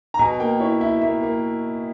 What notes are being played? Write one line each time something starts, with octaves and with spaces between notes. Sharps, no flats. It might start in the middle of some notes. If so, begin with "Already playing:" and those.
A#5
B2 G#5
A#3 G5
E4 C#5
E4 E5
A#3 E5
A#3